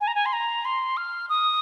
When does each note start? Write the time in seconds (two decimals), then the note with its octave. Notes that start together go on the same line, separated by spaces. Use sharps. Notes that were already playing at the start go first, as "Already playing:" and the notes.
0.01 G#5
0.07 A#5
0.15 G#5
0.26 C6
0.33 A#5
0.65 C6
0.97 F6
1.29 D#6